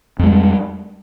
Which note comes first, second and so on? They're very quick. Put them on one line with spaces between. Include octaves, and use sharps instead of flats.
F2 G#3 G3